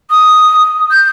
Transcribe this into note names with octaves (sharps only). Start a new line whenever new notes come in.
D#6
G6